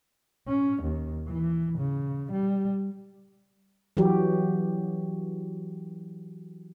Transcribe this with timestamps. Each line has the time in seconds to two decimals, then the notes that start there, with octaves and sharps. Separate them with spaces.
0.48 C#4
0.83 D#2
1.28 E3
1.78 C#3
2.32 G3
3.97 E3 F#3 F#4 G4